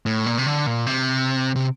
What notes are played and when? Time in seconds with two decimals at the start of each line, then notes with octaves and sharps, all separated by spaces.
0.06 A2
0.26 A#2
0.38 C3
0.46 D3
0.67 A#2
0.87 C3
1.56 C3